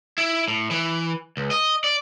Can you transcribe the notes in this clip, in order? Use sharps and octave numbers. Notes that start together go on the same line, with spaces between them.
E4
A2
E3
C#2
D#5
D5